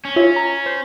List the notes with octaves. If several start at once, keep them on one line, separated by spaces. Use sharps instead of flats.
C#4
F4 C#5 E5
A#5
C5